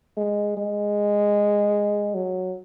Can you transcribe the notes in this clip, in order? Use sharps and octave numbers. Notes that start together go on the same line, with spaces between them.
G#3
G#3
F#3